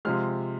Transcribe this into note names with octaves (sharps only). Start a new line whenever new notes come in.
C3 F3 G#3 F6